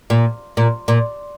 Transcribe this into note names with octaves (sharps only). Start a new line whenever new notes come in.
A#2
A#2
A#2